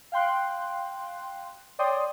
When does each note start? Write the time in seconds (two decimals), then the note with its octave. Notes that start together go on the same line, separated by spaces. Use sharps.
0.12 F5 G5 C6 F#6
1.79 C#5 D5 G5 C6 D#6